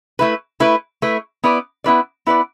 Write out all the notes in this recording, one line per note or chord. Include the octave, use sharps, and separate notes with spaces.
A3 E4 B4
A3 E4 B4
A3 E4 B4
B3 E4 B4 D5
B3 E4 B4 D5
B3 E4 B4 D5